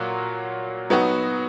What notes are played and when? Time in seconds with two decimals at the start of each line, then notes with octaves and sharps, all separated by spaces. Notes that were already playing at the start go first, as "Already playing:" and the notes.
Already playing: A#2 F#3 A#3 F#4
0.90 F#3 B3 D#4 F#4